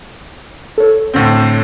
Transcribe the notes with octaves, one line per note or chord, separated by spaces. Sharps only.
A4 C#5
A2 D3 C4